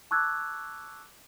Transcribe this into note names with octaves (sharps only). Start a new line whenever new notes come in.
A5 C#6 D6 E6 F#6 G#6